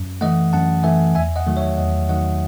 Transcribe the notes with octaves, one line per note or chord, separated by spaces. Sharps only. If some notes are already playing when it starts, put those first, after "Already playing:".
Already playing: F#2
E3 A3 D#5 F#5
F#2 F#5 A5
E3 A3 E5 G#5
E2 E5 G#5
D#5 F#5
D#3 F#3 A3
C#5 E5
E2 D#5 F#5
D#3 F#3 A3 D#5 F#5